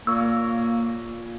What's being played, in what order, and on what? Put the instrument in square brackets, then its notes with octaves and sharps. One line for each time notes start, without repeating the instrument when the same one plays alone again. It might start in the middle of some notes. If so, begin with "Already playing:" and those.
[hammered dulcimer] A#2 C#5 [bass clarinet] A#3 [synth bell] E6